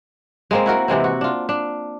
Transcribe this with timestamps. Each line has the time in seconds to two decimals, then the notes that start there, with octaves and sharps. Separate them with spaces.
0.51 G#3 A#3 C4
0.66 E4 F#4 A#4
0.88 C3 E3 G#3 C4
1.04 F#4
1.21 D4 F4
1.49 D4